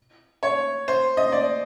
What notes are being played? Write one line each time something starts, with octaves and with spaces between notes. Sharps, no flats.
C#5
C5
D#5
D5